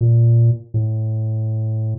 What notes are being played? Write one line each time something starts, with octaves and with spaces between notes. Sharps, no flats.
A#2
A2